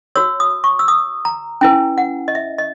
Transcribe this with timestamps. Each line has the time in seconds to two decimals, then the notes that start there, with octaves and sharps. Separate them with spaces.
0.16 F#4 C#5 E6
0.40 D#6
0.64 C#6
0.79 E6
0.88 D#6
1.25 A#5
1.61 C#4 E4 B4 G#5
1.98 F#5
2.28 D#5
2.35 E5
2.58 D#5